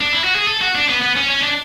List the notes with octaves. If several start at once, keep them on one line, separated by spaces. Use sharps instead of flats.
D4
E4
F#4
G#4
A4
F#4
D4
B3
B3
C#4
C#4
D4